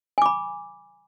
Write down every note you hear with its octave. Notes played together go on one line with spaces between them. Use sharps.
G#5 B5 D6